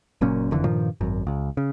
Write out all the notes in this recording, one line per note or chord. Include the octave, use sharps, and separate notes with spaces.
F#1 F#2 A#2 C#4
F#1 F2 D3 E3
G2 A#2 D#3 F3
G#1 F#2
C#2
C#3